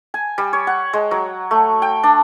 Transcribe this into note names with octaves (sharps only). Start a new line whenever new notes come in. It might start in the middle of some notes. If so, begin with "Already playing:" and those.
G#5
G3
C#5
F#5
G#3
F#3
A3
G5
D4